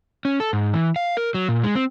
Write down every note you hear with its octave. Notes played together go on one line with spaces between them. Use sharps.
C#4
A4
G#2
E3
F5
A#4
F#3
A#2
G#3
C4